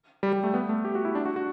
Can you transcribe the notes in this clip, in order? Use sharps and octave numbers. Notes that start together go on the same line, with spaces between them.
G3
G3
A3
B3
A3
G4
F#4
E4
D4
F#4
F#4